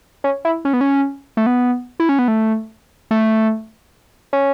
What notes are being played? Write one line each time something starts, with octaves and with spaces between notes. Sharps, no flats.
C#4
E4
C#4
B3
C#4
A3
B3
E4
C#4
B3
A3
A3
C#4